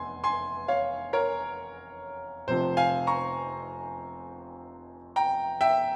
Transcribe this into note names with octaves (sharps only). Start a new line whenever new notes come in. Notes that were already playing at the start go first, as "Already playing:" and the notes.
Already playing: F1 E2 G#5 C6
G#5 C6
C#5 F5
A#4 C#5
F1 F2 C3 F3 C5
F5 G#5
A#5 C#6
G5 A#5
E5 G5